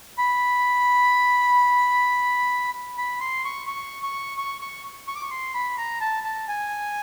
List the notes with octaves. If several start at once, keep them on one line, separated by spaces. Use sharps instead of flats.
B5
B5
C6
C#6
C#6
C#6
C#6
C#6
C#6
D6
C#6
C6
B5
A#5
A5
A5
G#5